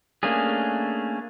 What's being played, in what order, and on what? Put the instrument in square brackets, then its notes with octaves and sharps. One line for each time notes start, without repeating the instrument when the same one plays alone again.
[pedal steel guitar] A3 A#3 C#4 D4 G#4